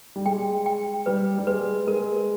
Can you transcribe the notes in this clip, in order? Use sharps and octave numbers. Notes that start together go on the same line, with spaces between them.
G3
G#3 G5
G5
G3 B4
G3
G#3 B4
G#3 A#4